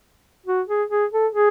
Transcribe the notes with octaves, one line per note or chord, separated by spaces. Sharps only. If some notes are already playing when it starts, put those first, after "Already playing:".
F#4
G#4
G#4
A4
G#4